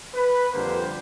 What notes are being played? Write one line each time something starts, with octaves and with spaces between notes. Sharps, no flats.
B4
F2 D3 G3 A#3 C5